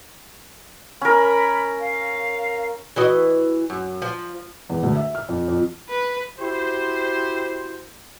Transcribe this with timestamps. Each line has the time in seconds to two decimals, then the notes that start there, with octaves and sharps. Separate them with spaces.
1.02 C#4 A#4 B5
1.80 F5
2.96 E3 F#4 D#5
3.70 F#2
4.02 F3
4.70 E2
4.83 D2
4.95 E5
5.15 F6
5.29 F2
5.48 F2
5.89 B4
6.39 E4 F#4 G4 C5